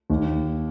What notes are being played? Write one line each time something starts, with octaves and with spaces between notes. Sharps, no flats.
D#2